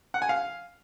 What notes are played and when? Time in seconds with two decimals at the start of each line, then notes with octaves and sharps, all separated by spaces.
0.14 F#5
0.22 G#5
0.29 F5